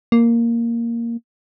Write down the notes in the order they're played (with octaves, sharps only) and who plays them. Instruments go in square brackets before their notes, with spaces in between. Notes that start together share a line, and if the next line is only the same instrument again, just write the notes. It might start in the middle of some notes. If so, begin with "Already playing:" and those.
[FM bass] A#3